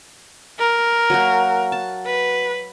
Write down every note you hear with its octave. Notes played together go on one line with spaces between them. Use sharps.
A#4
F#3 A#3 F#4
A5
B4